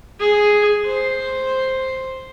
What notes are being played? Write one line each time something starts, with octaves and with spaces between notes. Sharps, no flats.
G#4
C5